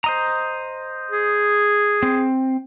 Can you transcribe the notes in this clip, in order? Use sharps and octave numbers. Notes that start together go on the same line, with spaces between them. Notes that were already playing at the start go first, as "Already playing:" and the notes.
C5 D#5 A#5
G#4
C4